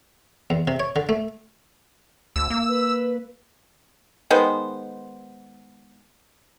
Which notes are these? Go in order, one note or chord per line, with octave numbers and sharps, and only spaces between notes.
E2
C3
C#5
D3
A3
D2 E6
A#3
B4
D#3 G#3 B3 C5